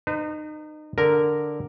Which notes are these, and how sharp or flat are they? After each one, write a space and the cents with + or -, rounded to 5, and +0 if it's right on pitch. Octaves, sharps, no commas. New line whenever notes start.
D#4 -30 B4 +40
D3 +0 A#4 +0